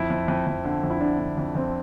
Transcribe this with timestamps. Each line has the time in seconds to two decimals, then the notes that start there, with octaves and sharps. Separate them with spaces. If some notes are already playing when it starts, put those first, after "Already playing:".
Already playing: F2 E4
0.10 F2
0.28 F2
0.47 F2
0.65 D3
0.83 F2
0.90 E4
1.01 D3 D4
1.19 D3
1.38 F2
1.55 F2 C4